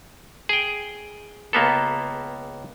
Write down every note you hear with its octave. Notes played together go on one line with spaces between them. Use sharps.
G#4 G5
C#2 A#3 B3 A4